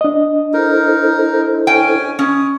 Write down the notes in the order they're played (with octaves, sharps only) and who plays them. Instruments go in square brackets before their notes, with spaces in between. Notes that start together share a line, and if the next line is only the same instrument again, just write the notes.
[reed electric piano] D4 D#5
[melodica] D#4 A#4 [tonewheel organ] E4 A4 C5
[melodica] C#4 G#5 [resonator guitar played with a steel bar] G5
[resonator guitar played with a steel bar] C#4 [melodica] D#6